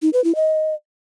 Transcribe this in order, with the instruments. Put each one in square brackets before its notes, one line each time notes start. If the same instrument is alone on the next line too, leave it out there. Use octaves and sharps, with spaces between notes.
[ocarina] D#4
B4
E4
D#5